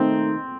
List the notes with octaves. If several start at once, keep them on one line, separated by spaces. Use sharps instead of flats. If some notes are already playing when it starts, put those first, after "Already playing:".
Already playing: D#3 A3 C4 D#4